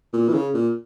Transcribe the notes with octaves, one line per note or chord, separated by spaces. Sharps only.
A#2
E3
C#3
A#2